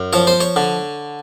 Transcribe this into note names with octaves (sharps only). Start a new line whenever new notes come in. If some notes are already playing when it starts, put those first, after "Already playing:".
Already playing: F#2
F3 C#5
C5
C#5
D3